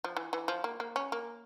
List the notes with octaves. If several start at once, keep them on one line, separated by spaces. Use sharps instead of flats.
F3
E3
E3
F3
A#3
A#3
C#4
A#3